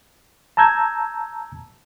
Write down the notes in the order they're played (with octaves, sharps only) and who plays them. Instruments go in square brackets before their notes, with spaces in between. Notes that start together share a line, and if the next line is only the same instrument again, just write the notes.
[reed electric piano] A5 A#5 E6 G6 G#6